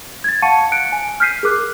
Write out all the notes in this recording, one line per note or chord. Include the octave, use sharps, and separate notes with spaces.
G#6 A6
F5 F#5 A5 C#6 C#7 D#7
F#6 C#7 D7
G#5
F6 G6 B6 C7 D#7
G#4 A#4 D6 F#6